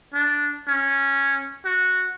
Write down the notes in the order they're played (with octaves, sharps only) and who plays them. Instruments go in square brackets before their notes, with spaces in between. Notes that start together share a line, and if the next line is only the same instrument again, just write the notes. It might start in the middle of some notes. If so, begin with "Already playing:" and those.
[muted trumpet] D4
C#4
F#4